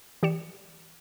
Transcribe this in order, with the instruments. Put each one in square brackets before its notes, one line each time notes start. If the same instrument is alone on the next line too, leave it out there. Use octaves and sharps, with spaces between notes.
[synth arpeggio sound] E3 G4 D5 G5 C#7 E7